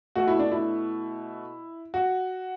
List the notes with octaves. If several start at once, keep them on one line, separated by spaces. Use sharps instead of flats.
B2 A3 F#4
E4
D4
E4
F#4